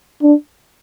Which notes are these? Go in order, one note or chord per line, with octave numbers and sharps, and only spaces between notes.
D4